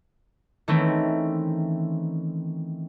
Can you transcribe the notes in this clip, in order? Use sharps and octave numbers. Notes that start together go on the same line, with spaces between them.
D#3 E3 A3 C4 C#4